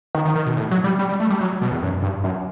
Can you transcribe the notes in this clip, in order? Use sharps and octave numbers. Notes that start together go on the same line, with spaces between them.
D#3
D#3
D#3
B2
A2
F#3
G3
G3
G3
A3
G3
F#3
B2
E2
F#2
G2
F#2